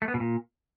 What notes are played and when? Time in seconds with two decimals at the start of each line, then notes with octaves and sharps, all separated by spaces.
0.02 A3
0.08 B3
0.14 B2
0.20 A#2